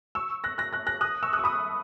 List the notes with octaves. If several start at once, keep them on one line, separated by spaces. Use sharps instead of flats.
C#6 E6
F#6 A#6
F#6 A#6
F#6 A#6
F#6 A#6
D#6 F#6
C#6 E6
D#6 F#6
C#6
B5 D#6